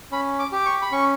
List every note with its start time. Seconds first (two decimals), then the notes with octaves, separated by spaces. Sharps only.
0.12 C#4 B5
0.39 D6
0.52 G4 D6
0.66 C#6
0.82 B5
0.92 C#4 C#6